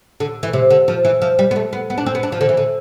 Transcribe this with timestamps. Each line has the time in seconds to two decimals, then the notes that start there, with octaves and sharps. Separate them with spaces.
0.20 D3
0.43 E3
0.53 C3
0.70 D3
0.88 F3
1.05 E3
1.22 F3
1.39 G3
1.51 B3
1.56 A3
1.73 B3
1.90 B3
1.98 D4
2.06 C4
2.15 B3
2.23 D4
2.32 F3
2.41 D3
2.49 E3
2.57 D3